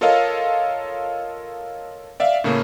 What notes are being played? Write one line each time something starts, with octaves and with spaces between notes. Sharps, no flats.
F4 A4 A#4 C#5 D#5 F5
D5 E5 F5
A2 C#3 A3 A#3 C#4